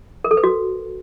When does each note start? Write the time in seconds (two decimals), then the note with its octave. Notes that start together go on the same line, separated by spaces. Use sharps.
0.24 A#4
0.31 A4
0.37 B4
0.44 F#4